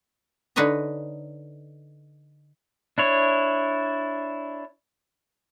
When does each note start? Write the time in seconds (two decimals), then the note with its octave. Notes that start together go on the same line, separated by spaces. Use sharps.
0.56 D3 D#4 B4 C#5 D#5 A#5
2.98 D4 E4 C#5